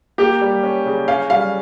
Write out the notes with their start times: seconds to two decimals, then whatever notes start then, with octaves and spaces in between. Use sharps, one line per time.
0.18 A#3 G4
0.41 G3
0.63 C#4
0.85 C#3
1.08 C#4 F5
1.30 G3 F5